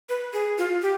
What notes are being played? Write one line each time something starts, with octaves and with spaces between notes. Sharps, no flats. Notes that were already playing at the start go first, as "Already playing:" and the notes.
B4
G#4
F4
G4